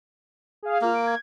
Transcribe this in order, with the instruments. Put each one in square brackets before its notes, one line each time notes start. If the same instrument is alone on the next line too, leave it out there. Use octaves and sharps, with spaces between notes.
[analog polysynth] G#4 F5
[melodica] A#3 [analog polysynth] F4 F6
[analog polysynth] D7
G#6